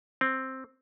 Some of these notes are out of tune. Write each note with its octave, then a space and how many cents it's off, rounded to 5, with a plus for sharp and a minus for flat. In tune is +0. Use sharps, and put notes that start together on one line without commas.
C4 +5